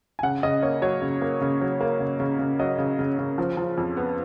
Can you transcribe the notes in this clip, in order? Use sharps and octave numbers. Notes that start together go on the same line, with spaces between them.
G#5
C#3 F#5
C#3 D#5
A#3 C#5
F#3 C#5
C#3
A#3
C#3
F#3
A#3
C#3
C#3
C#3
F#3 D#5
C#3
C#3
C#3
F3
F3
F2
B3